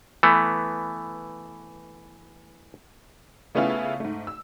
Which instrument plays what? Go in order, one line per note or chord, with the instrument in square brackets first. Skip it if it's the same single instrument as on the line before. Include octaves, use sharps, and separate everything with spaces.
[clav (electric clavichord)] E3 A3 B3
[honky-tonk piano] C#3 A3 B3 C#4 E4 F4
G#2 A3
E6